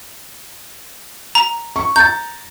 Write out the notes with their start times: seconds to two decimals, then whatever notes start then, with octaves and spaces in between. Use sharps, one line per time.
1.35 A#5
1.76 C#6
1.96 A#5 G6 A6